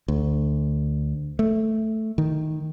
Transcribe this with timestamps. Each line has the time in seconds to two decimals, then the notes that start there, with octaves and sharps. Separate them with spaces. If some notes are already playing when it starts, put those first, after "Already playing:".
0.08 D2
1.39 A3
2.18 D#3